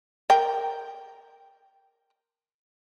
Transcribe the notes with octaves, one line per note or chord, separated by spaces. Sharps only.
A#4 G5